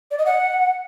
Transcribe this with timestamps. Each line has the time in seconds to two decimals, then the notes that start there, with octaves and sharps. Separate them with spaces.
0.11 D5
0.18 D#5
0.25 F#5